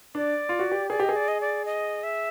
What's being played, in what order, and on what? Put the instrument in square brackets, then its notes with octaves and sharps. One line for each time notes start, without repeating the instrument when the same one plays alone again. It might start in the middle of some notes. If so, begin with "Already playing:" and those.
[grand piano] D4 [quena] D5
[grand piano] F4
F#4
G4
[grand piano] G#4 [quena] D5
[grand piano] G4 [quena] D#5
[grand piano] G#4
[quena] D5
D#5
D5
D#5
E5